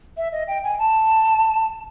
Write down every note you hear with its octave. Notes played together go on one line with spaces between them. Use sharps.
E5
D#5
G5
G#5
A5